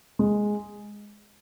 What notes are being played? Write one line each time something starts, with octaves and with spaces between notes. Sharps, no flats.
G#3